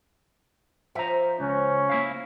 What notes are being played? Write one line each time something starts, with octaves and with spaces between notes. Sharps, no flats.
F3 E5 A#5
C#2 C#4
A#3 E4 F5